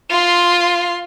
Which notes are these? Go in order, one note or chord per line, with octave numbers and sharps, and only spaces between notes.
F4 C6